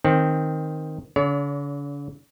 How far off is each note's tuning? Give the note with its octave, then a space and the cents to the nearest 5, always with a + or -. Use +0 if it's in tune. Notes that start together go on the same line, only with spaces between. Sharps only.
D#3 +0 C4 +5
D3 -45 C#5 +40